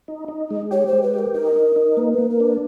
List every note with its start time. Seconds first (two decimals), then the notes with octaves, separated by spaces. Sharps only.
0.08 D#4
0.28 D#4
0.51 G#3
0.71 G4 C#5
0.87 C5
0.93 G#3
1.03 B4
1.14 G4 A#4
1.34 D#4 A#4
1.56 D#4
1.76 D#4
1.97 A#3 B4
2.13 B4
2.18 A#3
2.30 A#4
2.40 D4 B4